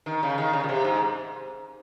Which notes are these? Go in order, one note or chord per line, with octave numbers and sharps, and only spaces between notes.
D#3
C#3
D#3
C#3
A#2
C3
G#2